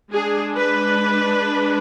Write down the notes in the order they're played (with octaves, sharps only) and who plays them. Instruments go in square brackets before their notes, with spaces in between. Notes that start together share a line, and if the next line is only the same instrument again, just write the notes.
[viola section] G#3 D4 G#4
B4